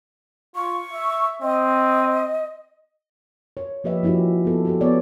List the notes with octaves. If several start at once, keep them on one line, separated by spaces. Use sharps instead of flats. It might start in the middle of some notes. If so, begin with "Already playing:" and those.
F4 C#6
E5
C4 D#5
C#5
F3 A#3 G4 B4 D#5 E5
F3 C#4 E4 F#4 G4
B3 A4
F#4 G4 A4
B3 G4 C#5 D5